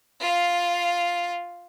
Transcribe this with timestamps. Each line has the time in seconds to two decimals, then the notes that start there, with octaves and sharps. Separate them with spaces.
0.21 F4 F5